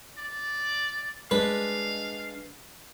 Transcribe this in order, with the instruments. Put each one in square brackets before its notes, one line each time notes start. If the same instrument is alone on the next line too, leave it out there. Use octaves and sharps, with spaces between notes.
[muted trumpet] D5
[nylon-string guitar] G#3 D4 D#5 [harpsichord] B4 [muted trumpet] F5